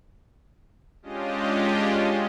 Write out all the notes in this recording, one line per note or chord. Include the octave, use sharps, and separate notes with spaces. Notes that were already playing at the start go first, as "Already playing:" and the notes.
G#3 C#4 D4 F4 G4 D#5